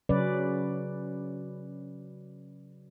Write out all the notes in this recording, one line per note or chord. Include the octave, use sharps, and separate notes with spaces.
C#3 F#3 C#4 B4 D5